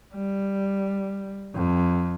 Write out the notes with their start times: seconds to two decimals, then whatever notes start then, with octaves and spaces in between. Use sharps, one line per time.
0.15 G3
1.55 F2